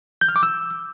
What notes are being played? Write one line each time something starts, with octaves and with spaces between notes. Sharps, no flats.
G6
F6
D6
E6